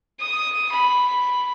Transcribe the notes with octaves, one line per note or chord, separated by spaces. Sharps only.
D#6
B5